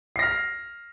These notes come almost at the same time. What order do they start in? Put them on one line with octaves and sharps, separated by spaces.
C7 A#6 F6